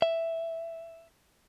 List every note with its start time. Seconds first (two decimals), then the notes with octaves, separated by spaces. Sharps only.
0.02 E5